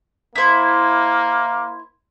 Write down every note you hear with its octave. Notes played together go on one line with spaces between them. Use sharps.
A#3 E4 C5